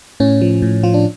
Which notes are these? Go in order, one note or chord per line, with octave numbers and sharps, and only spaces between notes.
A2 C#4
F3
A2
F3 F4
D4